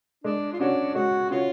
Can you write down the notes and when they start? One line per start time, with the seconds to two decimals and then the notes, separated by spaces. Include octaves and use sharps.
0.24 G#3 D4
0.53 F4
0.59 C#4 D4 F#4 C#5
0.94 G#3 F#4
1.30 C#4 F4 F#4 C#5